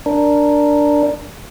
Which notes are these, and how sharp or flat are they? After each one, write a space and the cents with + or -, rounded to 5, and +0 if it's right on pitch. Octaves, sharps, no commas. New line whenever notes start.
D4 +0 A#4 +0